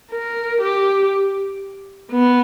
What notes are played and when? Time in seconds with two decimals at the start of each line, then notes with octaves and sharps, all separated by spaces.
0.11 A#4
0.61 G4
2.12 B3